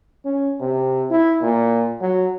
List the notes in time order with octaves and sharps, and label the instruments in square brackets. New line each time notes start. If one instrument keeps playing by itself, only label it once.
[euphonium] C#4
C3
E4
A#2
F#3